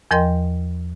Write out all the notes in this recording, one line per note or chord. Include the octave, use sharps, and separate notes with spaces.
E2 F3 A#4 D#5 G5 C6